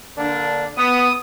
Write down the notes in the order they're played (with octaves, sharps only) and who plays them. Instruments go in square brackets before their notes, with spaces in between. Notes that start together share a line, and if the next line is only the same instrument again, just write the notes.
[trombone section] D3 A#3 D4
[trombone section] B3 [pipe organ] D#6